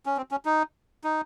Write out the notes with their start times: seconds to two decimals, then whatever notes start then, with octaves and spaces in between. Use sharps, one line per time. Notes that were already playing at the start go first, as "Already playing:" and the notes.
0.06 C#4
0.17 C4
0.31 C#4
0.45 D#4
1.04 D#4